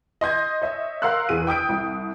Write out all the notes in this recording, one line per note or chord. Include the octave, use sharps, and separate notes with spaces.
D#5 C6 G6 G#6
C#5 D#5 E5
A#4 F5 F#5 C6 E6 F#6
E2 G#4 D#7
G5 D#6 G6 D7
C2